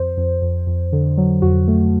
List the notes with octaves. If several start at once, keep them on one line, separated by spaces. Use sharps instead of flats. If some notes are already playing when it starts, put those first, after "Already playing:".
Already playing: F2 C5
F2
F2
F2
D3
F#3
F2 F#4
A3